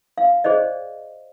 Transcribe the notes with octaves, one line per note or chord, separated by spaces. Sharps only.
F5
G#4 C5 D5 D#5